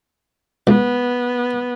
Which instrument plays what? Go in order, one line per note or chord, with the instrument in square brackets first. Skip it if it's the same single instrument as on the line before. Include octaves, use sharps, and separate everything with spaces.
[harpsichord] C#2 [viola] B3